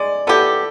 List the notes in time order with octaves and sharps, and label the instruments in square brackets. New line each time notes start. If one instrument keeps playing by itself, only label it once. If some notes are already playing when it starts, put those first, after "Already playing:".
Already playing: [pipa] G#3 [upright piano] D5
[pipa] B3 E4 G4 [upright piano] A4